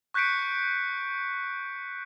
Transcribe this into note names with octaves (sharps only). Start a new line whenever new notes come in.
C#6 F#6 G6 B6 C#7 D7